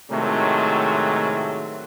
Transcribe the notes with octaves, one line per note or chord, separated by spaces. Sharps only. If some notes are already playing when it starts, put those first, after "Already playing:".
A2 C3 D#3 F#3 G#3 A3